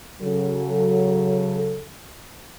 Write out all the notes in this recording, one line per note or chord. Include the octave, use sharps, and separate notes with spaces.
C#3 F#3 A4